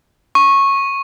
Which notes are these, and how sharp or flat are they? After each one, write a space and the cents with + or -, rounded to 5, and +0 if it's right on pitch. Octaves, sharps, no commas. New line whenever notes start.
C#6 -15